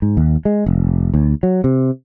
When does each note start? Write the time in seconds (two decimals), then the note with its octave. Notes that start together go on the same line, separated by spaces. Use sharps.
0.02 G#2
0.17 D#2
0.45 G#3
0.66 F1
1.14 D2
1.43 F#3
1.64 C3